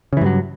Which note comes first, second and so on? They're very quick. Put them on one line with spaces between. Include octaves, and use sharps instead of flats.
C#3 E3 G2 F#3